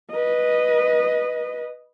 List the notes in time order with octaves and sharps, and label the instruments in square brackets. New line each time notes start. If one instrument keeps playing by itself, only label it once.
[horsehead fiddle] B4 D#5